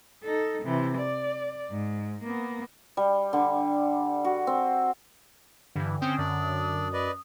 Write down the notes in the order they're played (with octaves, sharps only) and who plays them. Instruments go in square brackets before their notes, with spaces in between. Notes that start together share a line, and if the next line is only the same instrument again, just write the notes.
[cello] D#4 A4
C3 E3
D5
G#2
A#3 B3
[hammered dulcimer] G3
D3
F#4
C4
[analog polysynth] G2 E3 [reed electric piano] D3
[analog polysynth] C4 C#4 [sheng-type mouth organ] G5 [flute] D#6
[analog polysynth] F#2 [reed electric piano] D3 [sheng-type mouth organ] D4 D5
[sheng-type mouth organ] B4 D5 D#5